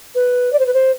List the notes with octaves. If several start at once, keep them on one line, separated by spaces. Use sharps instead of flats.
B4
D5
C5
B4
C5